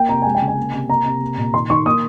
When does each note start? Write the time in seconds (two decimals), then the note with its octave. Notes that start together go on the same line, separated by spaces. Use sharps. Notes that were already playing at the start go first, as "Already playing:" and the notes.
Already playing: A#3 G5
0.09 C3 A#5
0.22 G#3 G#5
0.35 G5
0.41 C#3
0.48 G#5
0.57 A#3
0.73 C3
0.89 A#3 A#5
1.05 C3
1.21 A#3
1.38 A#2
1.54 D#3 C6
1.70 D#3 C#6
1.86 A#3 D#6